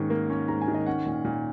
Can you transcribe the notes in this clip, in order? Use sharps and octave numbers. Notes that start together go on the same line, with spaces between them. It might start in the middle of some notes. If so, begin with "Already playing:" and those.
Already playing: G#2 D#3 A#3 C#4 C#6
A#3
C#4
G#2 A#5
G#5
D#3
D#5
C#4 F#5
A#2
A#2